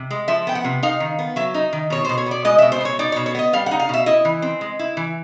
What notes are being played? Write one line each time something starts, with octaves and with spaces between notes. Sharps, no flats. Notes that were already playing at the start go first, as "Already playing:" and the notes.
Already playing: C3
G#3
F3 E5
B3 G5
F#5
C3
D#4 F5
D#3
B3
F#3 E5
D#4
D#3
B2 C#5
B2 C5
C#5
B3 D5
G#3 D#5
B2 E5
C5
B2 C#5
D#4 D5
B2 C#5
C#5
B3 D#5
G3 F5
F#5
D#4
F5
B2 E5
E4 D#5
E3
C4
G#3
E4
E3